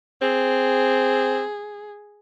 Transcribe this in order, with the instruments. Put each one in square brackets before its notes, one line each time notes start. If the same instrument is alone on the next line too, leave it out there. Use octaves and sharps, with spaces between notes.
[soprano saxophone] C4 [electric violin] G#4